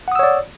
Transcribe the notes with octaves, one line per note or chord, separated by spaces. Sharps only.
C#5 D5 F#5 D#6 E6